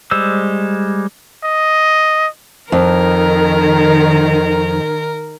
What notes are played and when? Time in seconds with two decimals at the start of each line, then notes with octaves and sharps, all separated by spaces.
0.11 G3 G#3 C5 E6
1.44 D#5
2.72 F2 D#3 A#4